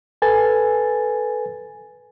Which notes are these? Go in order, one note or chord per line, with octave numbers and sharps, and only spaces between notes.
A4 B4 G#5 A6